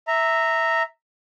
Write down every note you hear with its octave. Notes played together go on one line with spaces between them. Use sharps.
E5 A#5